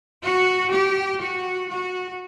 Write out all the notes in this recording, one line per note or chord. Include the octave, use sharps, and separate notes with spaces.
F#4
G4
F#4
F#4